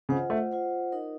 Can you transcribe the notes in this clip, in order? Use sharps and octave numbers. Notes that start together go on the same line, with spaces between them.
C#3 F4 C5 D#5 F#5
A3
F4 C5 D#5 F#5
D#4 A#4 D#5